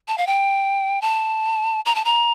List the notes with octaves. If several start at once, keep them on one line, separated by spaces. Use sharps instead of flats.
A5
F5
G5
A5
A#5
A5
A#5